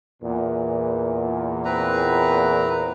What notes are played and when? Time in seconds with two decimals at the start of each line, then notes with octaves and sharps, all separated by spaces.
0.23 E2 A#2
1.65 C4 B4 A#5